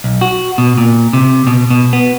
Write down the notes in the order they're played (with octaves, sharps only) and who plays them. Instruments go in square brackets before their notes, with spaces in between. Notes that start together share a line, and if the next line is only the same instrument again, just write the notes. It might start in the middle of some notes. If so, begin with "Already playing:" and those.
[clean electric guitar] B1
F#4
B2
A#2
C3
B2
B2
B3